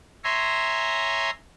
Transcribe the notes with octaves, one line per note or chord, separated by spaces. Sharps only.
C#5 E5 G#5 A#5 C6